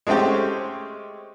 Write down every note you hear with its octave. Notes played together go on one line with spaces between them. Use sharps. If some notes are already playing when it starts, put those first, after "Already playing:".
G#3 A3 C4 C#4 G4